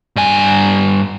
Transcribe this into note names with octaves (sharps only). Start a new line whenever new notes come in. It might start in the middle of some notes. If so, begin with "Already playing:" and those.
G2 G#5